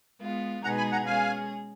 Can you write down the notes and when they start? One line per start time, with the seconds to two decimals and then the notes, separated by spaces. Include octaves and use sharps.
0.20 G#3 B3 F4
0.63 B2 G#3 D#4 G#4 B4 F#5 A#5
0.78 G#5 B5
0.92 F#5 A#5
1.06 G#3 C#4 G#4 F5 G#5